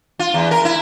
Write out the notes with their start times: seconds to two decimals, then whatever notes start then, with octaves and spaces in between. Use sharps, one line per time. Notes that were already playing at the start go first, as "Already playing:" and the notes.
0.19 F4
0.34 E2
0.51 A#4
0.65 E4